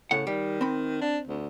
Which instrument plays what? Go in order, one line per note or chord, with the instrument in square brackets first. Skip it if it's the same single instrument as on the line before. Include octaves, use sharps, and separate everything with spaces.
[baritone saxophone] A2 [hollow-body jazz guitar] C#3 F#5
[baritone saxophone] D#3 [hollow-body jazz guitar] G3
[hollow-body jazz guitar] C4 B5
[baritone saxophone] D4
D2